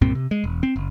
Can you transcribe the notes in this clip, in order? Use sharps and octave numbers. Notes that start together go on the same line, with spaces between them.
C2 G2 A#2 C4
C3
G#3
E1
C4
F#1